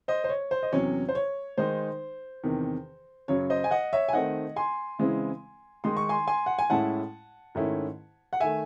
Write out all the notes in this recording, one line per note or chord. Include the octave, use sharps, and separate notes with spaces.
C5 D#5
C5
C#5
C5
D#5
E2 C3 F#3 C#4 C#5
C5
C#5
D#3 G#3 D#4 C5
E2 C3 D#3
F#2 C#3 F#3 C#5
C5 D#5
G#5
D#5 F#5
C#5 E5
G#5
D#3 A3 C4 D#4 D#5 F#5
G#5 C6
C#3 E3 G#3 C4 E4
D#3 G#3 D#4 C6
C#6
G#5 C6
G#5 C6
F#5
G#5
A2 G#3 C#4 E4 F#5 A5
G#2 D#3 A3 C#4 E4
F#5
D#3 A3 E5 G#5